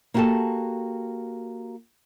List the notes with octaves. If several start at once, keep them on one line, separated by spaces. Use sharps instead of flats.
A#3 E4 F#4 G4 A4 A5